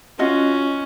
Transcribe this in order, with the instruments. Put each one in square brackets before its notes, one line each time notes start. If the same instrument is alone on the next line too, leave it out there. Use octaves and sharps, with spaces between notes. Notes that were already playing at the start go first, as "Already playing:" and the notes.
[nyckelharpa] C#4 [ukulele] F4 F#4 D#5